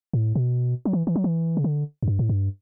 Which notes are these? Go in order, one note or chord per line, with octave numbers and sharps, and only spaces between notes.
A2
B2
F#3
E3
E3
F#3
E3
C#3
D3
F#2
G2
A2
G2